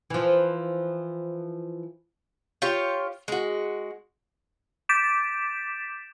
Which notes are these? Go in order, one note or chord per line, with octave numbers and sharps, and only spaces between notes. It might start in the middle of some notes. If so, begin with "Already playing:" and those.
E3 F3
F4 G4 C#5
G#3 F#4
D6 G6 A6 B6 D7 E7